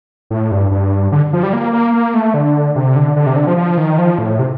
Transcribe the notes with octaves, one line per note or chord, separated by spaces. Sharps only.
A2
G2
G2
D3
F3
G3
A#3
A#3
A#3
A3
D3
C3
D3
D3
C3
D3
F3
F3
D#3
F3
A2
C3